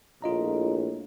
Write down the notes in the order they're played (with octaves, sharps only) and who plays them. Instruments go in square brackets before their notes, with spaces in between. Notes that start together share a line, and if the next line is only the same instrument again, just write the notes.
[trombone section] A#1 A2 [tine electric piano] F4 D#5 A#5